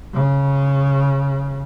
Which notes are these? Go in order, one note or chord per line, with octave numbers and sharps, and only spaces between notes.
C#3